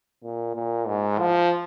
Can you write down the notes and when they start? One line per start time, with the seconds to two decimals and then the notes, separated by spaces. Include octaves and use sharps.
0.24 A#2
0.55 A#2
0.87 G#2
1.19 F3